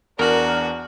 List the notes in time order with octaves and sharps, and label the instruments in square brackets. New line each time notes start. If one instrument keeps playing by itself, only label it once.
[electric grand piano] E2 F6 [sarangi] D4 [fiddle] F#4 [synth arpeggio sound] A#4